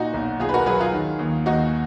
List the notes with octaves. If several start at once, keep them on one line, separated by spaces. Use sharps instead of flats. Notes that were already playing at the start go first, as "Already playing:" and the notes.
Already playing: A#2 D#4 F#4
B1
B1 F4 G#4
B4
F#4 A#4
F#3 G#4 B4
F4 G#4
D#3
D#2
D#2 D#4 F#4